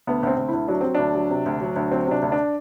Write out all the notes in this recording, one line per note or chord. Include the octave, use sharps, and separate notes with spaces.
D2 B3
D2 C4
D2
D2 E4
F#3 D4
F#3 C4
D2 D4
F#3
C3
D2
F#3
D2
F#3 C4
C3 D4
D2
D4